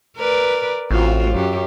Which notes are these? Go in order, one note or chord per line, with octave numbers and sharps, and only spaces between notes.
A#4 B4 D5
A1 C4 F4 F#4
F#2 G4